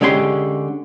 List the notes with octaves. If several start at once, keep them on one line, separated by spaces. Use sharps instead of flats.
D3 G#3 C#4 G4 F#5 C6